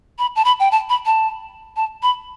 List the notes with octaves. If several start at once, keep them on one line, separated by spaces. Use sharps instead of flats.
B5
A5
B5
G5
A5
B5
A5
A5
B5